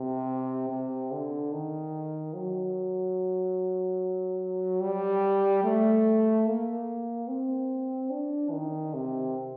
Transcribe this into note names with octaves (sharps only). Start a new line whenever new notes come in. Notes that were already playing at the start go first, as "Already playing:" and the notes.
Already playing: C3
C3
D3
D#3
F#3
G3
A3
A#3
C4
D4
D#3
C3